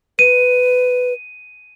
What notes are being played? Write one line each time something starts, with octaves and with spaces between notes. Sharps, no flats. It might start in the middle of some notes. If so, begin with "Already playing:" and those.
B4 D#7